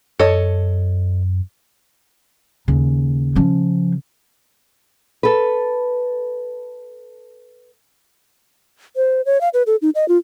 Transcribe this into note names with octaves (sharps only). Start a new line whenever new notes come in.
F#2 A4 C#5 D#5
D#2 C#3
F3 C#4
A4 B4
C5
C#5
F5
B4
A4
D#4
D#5
F4